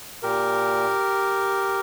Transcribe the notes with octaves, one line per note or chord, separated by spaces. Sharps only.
A#2 G4 A#4